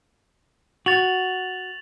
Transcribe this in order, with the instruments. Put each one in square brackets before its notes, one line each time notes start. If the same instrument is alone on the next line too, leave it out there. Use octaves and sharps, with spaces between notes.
[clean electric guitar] F#4 [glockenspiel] A6 F7 F#7